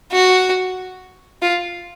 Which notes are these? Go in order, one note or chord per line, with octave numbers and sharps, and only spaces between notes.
F#4
F4